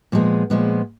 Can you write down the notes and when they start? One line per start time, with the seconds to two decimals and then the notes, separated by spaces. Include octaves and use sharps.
0.12 A#2 F3 G#3 B3
0.50 A#2 F3 G#3 B3